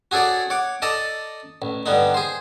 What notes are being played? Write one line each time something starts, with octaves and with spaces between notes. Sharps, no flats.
F#4 G#4 A4 C#5 D5
C#5 F#5 D6
A4 D5 D#5 A5 A#5
A1
G2 D3 B3 D#4
G#4 C5